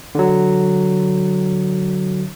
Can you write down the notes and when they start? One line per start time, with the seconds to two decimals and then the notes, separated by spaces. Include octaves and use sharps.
0.15 D3 F#3